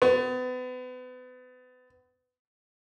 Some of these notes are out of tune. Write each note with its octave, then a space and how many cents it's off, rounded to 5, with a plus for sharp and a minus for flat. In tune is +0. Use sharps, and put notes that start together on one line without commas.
B3 +35